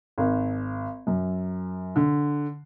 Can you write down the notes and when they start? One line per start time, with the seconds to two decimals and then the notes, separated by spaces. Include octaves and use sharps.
0.18 G#1
1.07 F#2
1.96 D3